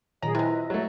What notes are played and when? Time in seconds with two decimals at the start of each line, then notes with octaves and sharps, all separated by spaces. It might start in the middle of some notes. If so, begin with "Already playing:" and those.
0.22 A#2 D#3 F#3 G#4 D#5 A#5
0.35 C3 G#3 E4 F4 B4 D#5
0.70 F#3 A3